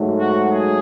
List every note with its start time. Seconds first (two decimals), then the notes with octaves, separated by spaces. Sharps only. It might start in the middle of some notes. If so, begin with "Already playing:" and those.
Already playing: G#2 F#3 A3
0.18 F#4
0.50 G#4